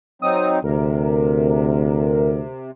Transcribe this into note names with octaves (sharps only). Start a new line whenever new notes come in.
F#3 C4 D#4 D#6
D2 C3 A#4